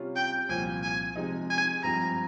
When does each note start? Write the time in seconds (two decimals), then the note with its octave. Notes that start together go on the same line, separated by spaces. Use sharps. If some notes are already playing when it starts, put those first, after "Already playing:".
Already playing: C3 G3 C#4 F4
0.16 G5
0.49 C2 A#2 F3 C4 F4 G#5
0.83 G#5
1.16 C3 F3 G#3 D#4
1.50 G#5
1.83 G2 F3 G#3 C4 A#5